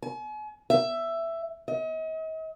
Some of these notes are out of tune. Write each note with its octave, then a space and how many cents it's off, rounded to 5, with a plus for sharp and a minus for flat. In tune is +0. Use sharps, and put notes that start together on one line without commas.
G#5 +40
E5 +10
D#5 +40